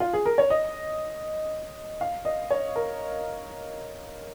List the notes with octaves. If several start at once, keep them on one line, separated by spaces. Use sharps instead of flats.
F4
G#4
A#4
C#5
D#5
F5
D#5
C#5
A#4